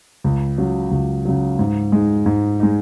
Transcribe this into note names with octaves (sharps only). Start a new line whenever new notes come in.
C#2
C#3 F#3
C#2
C#3 F#3
G#2
G#3 D#4
G#2
G#3 D#4